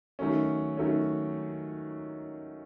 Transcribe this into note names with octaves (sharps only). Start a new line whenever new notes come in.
D#3 F#3 A3 C#4
D#3 F#3 A3 C#4